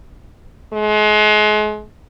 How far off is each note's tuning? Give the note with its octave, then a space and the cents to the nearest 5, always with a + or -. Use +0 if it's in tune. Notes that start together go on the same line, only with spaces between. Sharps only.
G#3 +35